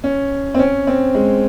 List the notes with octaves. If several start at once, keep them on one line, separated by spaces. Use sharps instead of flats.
C#4
C4
C#4
C4
G#3